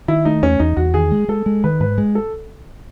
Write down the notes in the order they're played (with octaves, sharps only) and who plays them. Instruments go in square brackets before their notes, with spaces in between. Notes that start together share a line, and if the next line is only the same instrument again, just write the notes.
[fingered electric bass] D#3 [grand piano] E4
[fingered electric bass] A3 [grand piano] D#4
[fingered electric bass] E2 [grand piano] C#4
[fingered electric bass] E2 [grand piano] D#4
[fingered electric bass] E2 [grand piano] F#4
[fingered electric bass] D#3 [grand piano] G#4
[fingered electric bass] G#3
[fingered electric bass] G#3 [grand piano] A4
[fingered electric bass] G#3
[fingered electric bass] D#3 [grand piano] B4
[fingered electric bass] G#2 [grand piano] B4
[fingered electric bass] G#3
[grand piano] A4